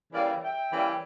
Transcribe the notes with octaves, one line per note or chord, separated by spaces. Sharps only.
C#3 E3 G3 A#3 D5 F5
E5 G5
C#3 E3 G3 A#3